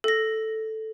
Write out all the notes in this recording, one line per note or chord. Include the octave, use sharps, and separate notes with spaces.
A4 A#6